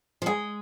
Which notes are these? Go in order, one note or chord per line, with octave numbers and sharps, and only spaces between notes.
F3
G#3 G#4